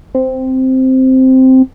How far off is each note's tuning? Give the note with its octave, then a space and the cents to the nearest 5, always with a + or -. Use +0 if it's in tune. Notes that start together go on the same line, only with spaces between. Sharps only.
C4 -5